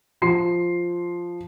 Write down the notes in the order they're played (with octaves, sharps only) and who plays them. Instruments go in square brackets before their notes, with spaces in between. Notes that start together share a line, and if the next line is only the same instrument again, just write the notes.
[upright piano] F3 C6 C7